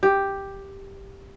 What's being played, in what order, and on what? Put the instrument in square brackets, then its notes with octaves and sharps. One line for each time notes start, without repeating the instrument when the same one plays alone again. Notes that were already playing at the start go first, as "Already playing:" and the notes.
[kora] G4